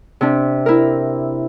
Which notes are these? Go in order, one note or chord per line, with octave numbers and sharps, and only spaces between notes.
C3 D4
E4 A#4